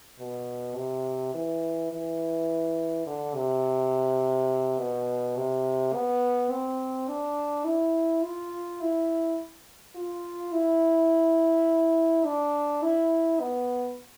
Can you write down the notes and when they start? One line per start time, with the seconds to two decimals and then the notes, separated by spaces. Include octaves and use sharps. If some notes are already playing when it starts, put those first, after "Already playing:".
0.19 B2
0.76 C3
1.34 E3
1.92 E3
3.07 D3
3.35 C3
4.79 B2
5.37 C3
5.94 B3
6.51 C4
7.08 D4
7.66 E4
8.23 F4
8.81 E4
9.96 F4
10.53 E4
12.25 D4
12.83 E4
13.40 B3